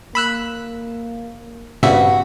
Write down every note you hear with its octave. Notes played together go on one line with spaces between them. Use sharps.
A#3 B5 E6 F#6
G2 A#2 C#3 C4 F#4 E5